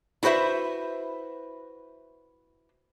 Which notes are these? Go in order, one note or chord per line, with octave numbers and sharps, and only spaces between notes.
E4 F#4 B4 C5 E5